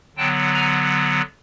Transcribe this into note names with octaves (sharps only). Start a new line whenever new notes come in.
D3 F#3 B3 G5 A5
G#5 A#5